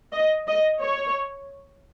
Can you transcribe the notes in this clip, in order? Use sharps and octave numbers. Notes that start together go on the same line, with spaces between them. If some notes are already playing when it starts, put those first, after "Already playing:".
D#5
D#5
C#5